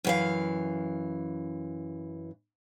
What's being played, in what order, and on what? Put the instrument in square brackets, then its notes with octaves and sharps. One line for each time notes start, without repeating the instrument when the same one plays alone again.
[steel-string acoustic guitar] F#2 E3 F5